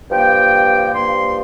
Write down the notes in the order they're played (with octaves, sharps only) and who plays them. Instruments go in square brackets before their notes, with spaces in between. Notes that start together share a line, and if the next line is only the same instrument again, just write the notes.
[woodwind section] G2 F3 A#3 G5
G2 F3 A#3 C6